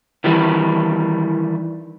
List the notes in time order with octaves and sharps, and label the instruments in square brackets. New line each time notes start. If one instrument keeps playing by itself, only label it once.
[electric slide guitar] D#3 E3 G3